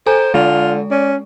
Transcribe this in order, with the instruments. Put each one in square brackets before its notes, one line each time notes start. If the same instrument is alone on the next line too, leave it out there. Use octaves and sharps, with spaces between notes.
[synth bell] A4 G#5 A#5 [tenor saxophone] C5
[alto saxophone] D3 [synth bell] G#3 [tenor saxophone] F4
[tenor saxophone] C#4 [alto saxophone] D5